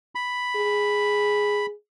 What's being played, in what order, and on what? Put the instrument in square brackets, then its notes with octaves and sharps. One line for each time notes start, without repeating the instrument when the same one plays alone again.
[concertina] B5
[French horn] G#4